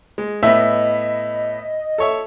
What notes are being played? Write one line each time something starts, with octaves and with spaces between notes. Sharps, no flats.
G#3
A2 B3 D#5 E5
A4 C#5 E5